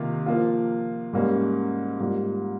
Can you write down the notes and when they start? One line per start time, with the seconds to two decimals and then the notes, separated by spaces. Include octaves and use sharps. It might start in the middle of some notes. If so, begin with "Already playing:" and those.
Already playing: C3 D#3 A#3 F4
0.26 F3 A#3 F4
1.13 G#2 G3 A#3 C#4
2.00 G#2 G3 A#3 F4